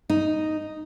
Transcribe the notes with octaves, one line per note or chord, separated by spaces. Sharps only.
D#4